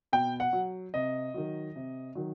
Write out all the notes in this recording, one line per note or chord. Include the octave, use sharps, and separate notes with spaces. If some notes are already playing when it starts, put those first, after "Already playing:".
B2 G5
F#5
F#3
C3 D#5
D#3 F#3
C3
D#3 F#3